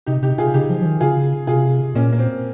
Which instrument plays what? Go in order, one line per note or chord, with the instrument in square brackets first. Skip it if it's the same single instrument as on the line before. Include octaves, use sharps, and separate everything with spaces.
[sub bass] C3 [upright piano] D#4 G4
[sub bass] C3 [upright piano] D#4 G4
[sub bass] C3 [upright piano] F4 G#4
[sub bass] C#3 [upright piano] D#4 G4
[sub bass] F3
F3
D#3
[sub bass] C#3 [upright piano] F4 G#4
[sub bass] C3 [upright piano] F4 G#4
[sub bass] A#2 [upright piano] A#3 C#4
[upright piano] A#3
C4